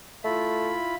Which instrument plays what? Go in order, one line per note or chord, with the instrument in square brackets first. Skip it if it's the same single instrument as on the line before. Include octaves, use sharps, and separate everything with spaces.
[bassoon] A3 [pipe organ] E4 F4 B5